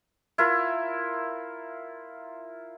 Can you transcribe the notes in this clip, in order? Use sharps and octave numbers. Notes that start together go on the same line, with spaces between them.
E4 F4 A#4